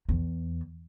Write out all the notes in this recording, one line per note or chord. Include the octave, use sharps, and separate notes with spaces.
E2